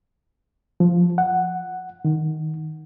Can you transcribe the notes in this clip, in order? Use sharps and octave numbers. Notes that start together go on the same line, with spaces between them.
F3
F#5
D#3